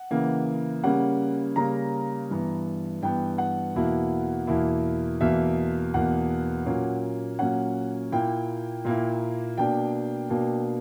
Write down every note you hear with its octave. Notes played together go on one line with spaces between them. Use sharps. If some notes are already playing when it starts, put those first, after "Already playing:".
Already playing: F#5
C#3 E3 A#3
C#3 G3 A#3 C#4 F#5
C#3 G3 A#3 C#4 A#5
G2 E3 B3
G2 E3 B3 G5
F#5
E2 B2 A#3 E4
E2 B2 A#3 E4
E2 B2 A#3 E5
E2 B2 A#3 F#5
A#2 F#3 A#3 C#4
A#2 F#3 A#3 C#4 F#5
A#2 A#3 E4 G5
A#2 A#3 E4
B2 A#3 D4 G5
B2 A#3 D4